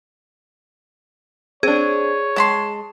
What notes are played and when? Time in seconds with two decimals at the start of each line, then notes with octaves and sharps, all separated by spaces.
1.63 C4 D4 G#4 C#5
2.36 G#3 A5 B5 C6